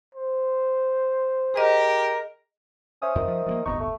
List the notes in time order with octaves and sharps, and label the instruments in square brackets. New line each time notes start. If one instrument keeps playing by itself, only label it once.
[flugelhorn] C5
[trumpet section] G4 A#4 [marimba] G#4 D#5
[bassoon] C#4 [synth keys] C5 E5 D#6
[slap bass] F2 [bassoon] D#3
[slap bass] F3
F3 A3 A#3
[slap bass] D1 G1 B3 [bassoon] D#4 [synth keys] C#6
[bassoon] A3